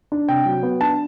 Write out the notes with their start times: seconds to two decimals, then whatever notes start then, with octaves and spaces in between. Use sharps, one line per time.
0.12 D4
0.28 C3 G5
0.46 F#3
0.63 B3
0.81 D4 A5